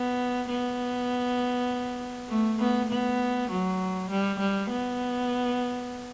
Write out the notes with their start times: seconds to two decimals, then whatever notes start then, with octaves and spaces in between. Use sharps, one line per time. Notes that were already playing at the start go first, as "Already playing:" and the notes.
Already playing: B3
0.50 B3
2.29 A3
2.59 B3
2.89 B3
3.50 F#3
4.10 G3
4.39 G3
4.70 B3